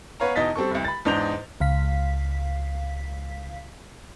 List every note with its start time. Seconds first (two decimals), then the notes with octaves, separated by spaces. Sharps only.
0.20 B3 B4 C#5 F5 A#5
0.35 E2 B2 D#4 D#5 A6 B6
0.56 G3 C4 A4 C#6
0.71 F1 C2
0.85 B5 A6
1.05 E2 G#2 D4 D#5 G6 F7
1.60 C#2 F5 B6